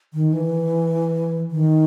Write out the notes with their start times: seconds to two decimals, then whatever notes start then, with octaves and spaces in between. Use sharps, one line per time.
0.14 D#3
0.33 E3
1.51 D#3